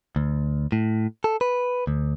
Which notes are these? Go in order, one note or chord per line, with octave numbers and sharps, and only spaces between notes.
D2
A2
A4
B4
D2